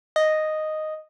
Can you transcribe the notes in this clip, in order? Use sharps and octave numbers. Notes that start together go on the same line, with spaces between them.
D#5